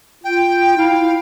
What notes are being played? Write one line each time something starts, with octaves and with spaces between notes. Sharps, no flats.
F4 G5
E4 F5